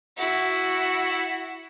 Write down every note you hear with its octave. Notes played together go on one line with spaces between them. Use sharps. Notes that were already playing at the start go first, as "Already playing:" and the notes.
E4 F#4